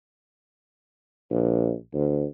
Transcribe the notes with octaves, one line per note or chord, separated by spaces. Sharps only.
A#1
D2